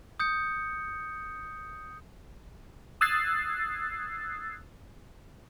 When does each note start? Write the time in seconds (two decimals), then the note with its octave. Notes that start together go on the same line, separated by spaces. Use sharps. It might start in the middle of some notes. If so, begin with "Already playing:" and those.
0.20 D#6 G6 C#7
3.01 D#6 E6 F#6 G#6 A6 C7